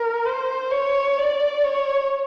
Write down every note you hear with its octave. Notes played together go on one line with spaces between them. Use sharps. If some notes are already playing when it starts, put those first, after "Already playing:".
Already playing: A#4
C5
C#5
D5
C#5